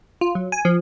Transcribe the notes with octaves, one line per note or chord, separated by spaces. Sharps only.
F4
F#3
G#5
F3